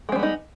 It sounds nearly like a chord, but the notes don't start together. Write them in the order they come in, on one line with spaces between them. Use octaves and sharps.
G#3 C4 G3 B3 D#4